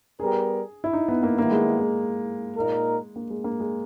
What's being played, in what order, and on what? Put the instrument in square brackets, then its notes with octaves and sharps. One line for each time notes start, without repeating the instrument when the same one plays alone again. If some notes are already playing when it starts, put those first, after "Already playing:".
[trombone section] G3 B3 G4 A#4 [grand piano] G#4
[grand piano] E4
D#4
B3
A#3
[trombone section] D#3 G3 B3 E4 [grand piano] A#3
[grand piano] G#3
G#3
[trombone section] A#2 A#3 D#4 A#4
[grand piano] A#3
G#3
A#3
G#3